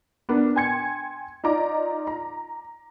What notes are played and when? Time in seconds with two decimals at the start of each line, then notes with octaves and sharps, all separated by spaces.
0.29 B3 D4 A#4
0.55 G5 G#5 C6 G#6 C#7
1.44 D#4 F4 D5 A#5 D6
2.07 A#5